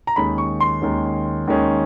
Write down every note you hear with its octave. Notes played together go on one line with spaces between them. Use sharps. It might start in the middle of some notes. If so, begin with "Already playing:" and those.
A#5
D#2 D#3 G#3 C#4 B5
C#6
C6
D#2 D#3 G#3 C#4
D#2 D#3 G#3 C#4